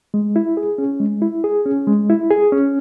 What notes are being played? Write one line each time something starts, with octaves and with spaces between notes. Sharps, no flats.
G#3
E4
G#4
C#4
G#3
E4
G#4
C#4
G#3
E4
G#4
C#4